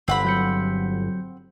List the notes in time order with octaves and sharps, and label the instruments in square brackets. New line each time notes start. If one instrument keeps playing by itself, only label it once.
[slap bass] G1 [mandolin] C4 F#5 B5
[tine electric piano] F#3 G6 C#7